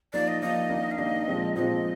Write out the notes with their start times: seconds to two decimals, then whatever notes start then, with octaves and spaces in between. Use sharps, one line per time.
0.13 F3 A#3 D#4 D5
0.28 D#5
0.42 F3 A#3 D#4 D#5
0.70 D#3 A#3 D4
0.91 F5
0.98 D#3 A#3 D4 D#5
1.27 A#2 F3 G#3 C4
1.56 A#2 F3 G#3 C4 D#5